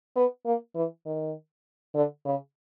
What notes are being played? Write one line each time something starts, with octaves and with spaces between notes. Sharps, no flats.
B3
A#3
E3
D#3
D3
C#3